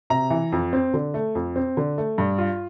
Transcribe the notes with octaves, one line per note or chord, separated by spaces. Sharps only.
C3 A#5
E3
F2
C4
D3
A3
F2
C4
D3
A3
G2
F4